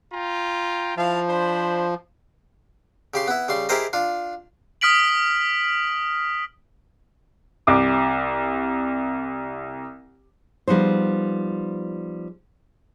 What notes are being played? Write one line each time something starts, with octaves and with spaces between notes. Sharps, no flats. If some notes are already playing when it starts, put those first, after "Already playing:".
F4 G5 A#5
F3 E4 F5 A5
D4 C5 B5
C#3 G4 C6
B3 E4
C#3 G3 C6
E4 G4 G#4 A#4 C5 D#5
D4 F4
D#6 F6 B6 D7 F#7
C2 D6
F3 G3 B3 D#4 C5